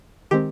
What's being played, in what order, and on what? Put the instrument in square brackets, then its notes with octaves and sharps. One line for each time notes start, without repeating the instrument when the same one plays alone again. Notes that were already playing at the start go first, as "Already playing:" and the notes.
[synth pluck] D#3 G#3 C4 G4